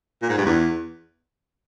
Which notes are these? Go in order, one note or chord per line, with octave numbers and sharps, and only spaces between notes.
A#2
G#2
G2
E2